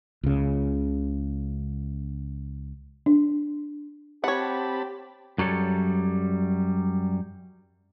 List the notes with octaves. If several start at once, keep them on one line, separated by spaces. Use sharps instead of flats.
C#2 C#3
D4
C4 G4 C#5 F#5 A5 B5
F#2 F#3 G3 A4 C#5